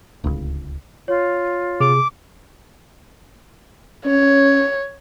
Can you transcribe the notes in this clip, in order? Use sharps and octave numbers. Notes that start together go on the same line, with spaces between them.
D1 C#2
F4 C#5
C3 G#4 D6
C#4 C#5